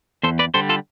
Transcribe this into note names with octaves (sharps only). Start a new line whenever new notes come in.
E2 A4 C5
B4 D5
D3 G3 A4 C5
F4 A4